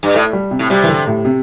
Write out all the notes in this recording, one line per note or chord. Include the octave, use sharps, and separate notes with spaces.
G2
A2 A3
G3
C3
A2
C3 G3
E3
D3
A2
C3